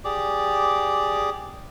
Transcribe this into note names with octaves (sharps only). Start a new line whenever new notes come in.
G4 G#4 D5 D6